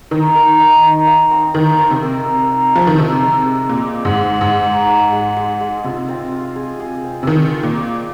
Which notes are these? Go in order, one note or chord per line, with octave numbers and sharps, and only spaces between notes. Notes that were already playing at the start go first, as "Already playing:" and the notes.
D#3 D#4
A#4
D#4
D#4
F5
C4
D#3 D#4
C4
C3
A#4
A#4
D#4
F3 C4
D#3
C3 D#4
G#3
G#3
A#2 G#3
C5
G#2
C5
G#2 G#3
D#4
G#3
G#3
G#3
G#3
C3 F4
C4
F4
G#4
G#4
C4
C3
D#3 F4
F4
A#2
F4